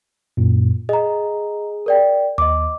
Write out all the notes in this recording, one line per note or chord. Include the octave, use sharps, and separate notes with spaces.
F#2 A#2
G#4 D#5 A#5
A#4 D5 G5
D#2 D#5 D6